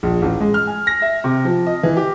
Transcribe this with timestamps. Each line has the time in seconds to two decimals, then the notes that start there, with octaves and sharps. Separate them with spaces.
0.03 A#1
0.22 A1
0.40 G#3
0.54 F6
0.67 G#5
0.87 A#6
1.02 E5
1.24 C3
1.45 F3
1.67 D#5
1.83 E3
1.97 G4